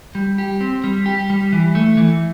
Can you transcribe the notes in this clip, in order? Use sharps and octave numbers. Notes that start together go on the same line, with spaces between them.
G3
G4
C4
G3
G4
G3
E3
A3
E3